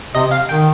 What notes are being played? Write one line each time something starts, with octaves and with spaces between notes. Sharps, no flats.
C3 D#5
F5
D#3 G5